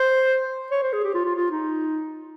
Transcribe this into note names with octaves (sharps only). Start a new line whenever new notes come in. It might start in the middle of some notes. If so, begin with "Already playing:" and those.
Already playing: C5
C#5
C5
G#4
G4
F4
F4
F4
D#4